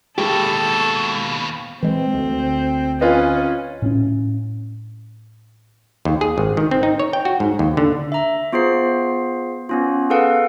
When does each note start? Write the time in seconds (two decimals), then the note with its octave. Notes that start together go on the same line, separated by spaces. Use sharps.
0.18 D#2 B2 G#3 G4 A4
1.83 E3 G#3 C4
2.14 D2
3.01 C#4 F4 B4 D#5
3.82 A2 C4 C#4
6.05 D#2
6.21 G#4
6.38 G#1
6.57 D#3
6.71 C4
6.83 D#4
7.00 C#5
7.13 G5
7.25 F#4
7.40 G#2
7.59 D#2
7.77 D3
8.12 E5 A#5
8.53 B3 F4 G#4 C5 C7
9.69 B3 C#4 F4
10.10 G#4 A4 B4 F5 F#5